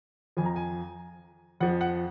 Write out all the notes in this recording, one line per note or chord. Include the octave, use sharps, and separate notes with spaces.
F2 F3 G#5
A#5
G#5
F2 F3 F#5
F#5